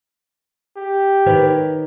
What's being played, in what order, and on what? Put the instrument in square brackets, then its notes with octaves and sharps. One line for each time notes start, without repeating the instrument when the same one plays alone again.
[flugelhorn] G4
[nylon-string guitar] D#3 B4 C#5